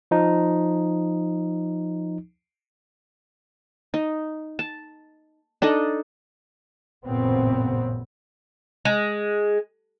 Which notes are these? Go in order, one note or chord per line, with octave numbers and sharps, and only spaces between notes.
F3 D#4
D#4
A5
D4 D#4 A4 D#5
A1 F#2 A#2 C#3 B3 C4
G#3